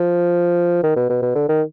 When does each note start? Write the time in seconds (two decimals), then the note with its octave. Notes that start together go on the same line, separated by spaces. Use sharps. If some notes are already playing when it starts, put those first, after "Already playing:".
Already playing: F3
0.83 D#3
0.96 B2
1.10 B2
1.22 B2
1.35 D3
1.49 D#3